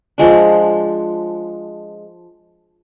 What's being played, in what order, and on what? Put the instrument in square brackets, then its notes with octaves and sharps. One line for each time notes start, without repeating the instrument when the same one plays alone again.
[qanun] F3 G#3 D4